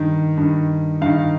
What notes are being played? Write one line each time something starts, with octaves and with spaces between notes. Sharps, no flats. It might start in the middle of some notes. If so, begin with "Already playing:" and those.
Already playing: G2 D#3
G2 D#3
G2 D#3 F5